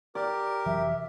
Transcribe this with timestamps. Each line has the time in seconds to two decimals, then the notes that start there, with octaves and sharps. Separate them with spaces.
0.15 G4 A#4 D5
0.66 F1 E3 F#3 E5